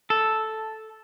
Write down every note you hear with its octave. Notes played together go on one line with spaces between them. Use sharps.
A4